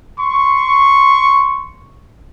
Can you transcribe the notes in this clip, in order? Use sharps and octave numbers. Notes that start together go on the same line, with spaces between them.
C6 C#6